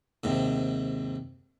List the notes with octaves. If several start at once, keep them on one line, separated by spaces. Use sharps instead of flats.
D#2 G#2 C3